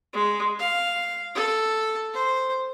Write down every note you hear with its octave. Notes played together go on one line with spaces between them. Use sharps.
G#3
F5
A4
C5